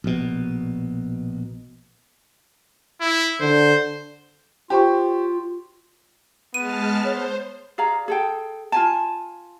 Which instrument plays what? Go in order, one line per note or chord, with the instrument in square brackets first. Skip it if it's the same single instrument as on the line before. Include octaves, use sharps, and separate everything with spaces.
[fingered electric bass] A#1 B2
[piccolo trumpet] E4
[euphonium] D3 [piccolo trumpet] C5
[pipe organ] F4 [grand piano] G4 C5 C#6
[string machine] G#3 A5 F6 [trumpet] B3 [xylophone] D#7
[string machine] C5 [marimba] C#5
[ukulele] G#4 D5 F5 A#5
G#4 A4 G5
F4 G#5 A5